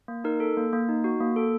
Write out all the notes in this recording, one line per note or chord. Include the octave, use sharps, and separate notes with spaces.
A#3
D#4 A#4
A4
A#3
A#3
D#4
F#4
A#3
A4